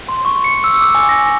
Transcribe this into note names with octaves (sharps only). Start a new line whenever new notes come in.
C6
C#6
C#7
E6
D6
G#5
A#6